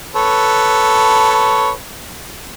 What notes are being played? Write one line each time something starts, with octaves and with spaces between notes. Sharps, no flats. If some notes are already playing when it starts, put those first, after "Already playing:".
A4 B4 C#5